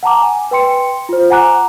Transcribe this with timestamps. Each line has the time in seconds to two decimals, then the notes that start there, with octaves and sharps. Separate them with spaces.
0.03 F#5 A5 A#5 D6
0.22 G#5
0.51 B4 G5 C6 C#7
1.09 F4 C5
1.30 F#5 G#5 A#5 D6 F#6